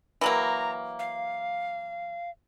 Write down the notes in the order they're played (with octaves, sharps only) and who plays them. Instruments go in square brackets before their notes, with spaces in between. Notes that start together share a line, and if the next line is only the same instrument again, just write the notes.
[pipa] E3 F#3 A#3 [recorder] A#5
[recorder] F5